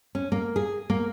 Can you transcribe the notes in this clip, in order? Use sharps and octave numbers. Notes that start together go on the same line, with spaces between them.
C#4
A#3
G#4
A#3